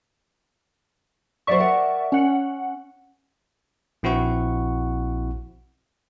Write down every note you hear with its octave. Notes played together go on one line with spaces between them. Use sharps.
B2 F#3 C5 D5 E5 C#6
A#4 F#5
C#4 C#5 F#5
A#1 C4 E4 F#4 F#5 C#6